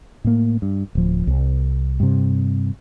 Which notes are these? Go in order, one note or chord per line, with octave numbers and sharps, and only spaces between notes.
A2 A#3
G2
D1 F3
C2
G2 C3